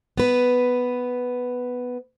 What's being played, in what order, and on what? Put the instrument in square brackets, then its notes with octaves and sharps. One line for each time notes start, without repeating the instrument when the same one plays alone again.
[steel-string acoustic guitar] B3 B4